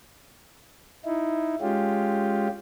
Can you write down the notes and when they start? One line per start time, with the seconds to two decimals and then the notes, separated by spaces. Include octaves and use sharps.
1.05 D#4 E4
1.61 G#3 C#4 F4 G4